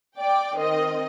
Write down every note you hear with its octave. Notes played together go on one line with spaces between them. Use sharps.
D5 G5 D6
D#3 C4 D#5